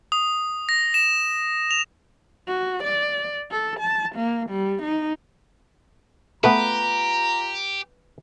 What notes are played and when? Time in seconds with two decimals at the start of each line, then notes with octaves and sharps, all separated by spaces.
0.12 D#6
0.69 A#6
0.94 E7
1.71 F7
2.48 F#4
2.83 D5
3.51 A4
3.80 A5
4.15 A#3
4.50 G3
4.82 D#4
6.44 A3 B3 F4 G4 B4 A#5